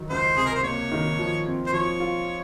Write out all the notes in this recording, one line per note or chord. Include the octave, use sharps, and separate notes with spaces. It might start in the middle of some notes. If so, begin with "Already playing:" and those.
Already playing: D#3 F#3
C#2 C5
C3 G#4
A#4
C5
A#3 C#5
D#3
F3
C4
C5
F3 C#5
F4